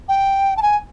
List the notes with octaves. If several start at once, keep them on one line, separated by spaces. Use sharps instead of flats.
G5
A5
G#5